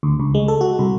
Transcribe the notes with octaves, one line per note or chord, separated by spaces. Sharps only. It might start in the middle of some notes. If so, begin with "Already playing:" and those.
D2
C#2
G#3
A4
F#4
C2